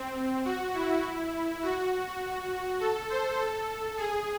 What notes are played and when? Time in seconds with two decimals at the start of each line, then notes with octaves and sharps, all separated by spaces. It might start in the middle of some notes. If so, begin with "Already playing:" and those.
Already playing: C4
0.45 F#4
0.74 E4
1.62 F#4
2.80 A4
3.09 C5
3.39 A4
3.97 G#4